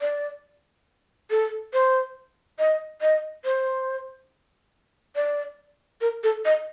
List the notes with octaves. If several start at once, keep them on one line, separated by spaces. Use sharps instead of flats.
D5
A4
C5
D#5
D#5
C5
D5
A#4
A4
D#5